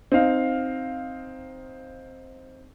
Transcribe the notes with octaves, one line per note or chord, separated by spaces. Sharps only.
C4 D#4 F5